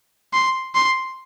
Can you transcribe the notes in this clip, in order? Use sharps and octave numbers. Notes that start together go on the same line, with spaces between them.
C6
C6